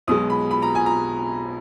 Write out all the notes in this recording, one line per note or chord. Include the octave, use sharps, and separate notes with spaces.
B1 B2 G#3 D#6
B5
B5
A#5
G#5
A#5